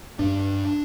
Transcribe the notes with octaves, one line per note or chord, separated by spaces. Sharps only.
G2 D4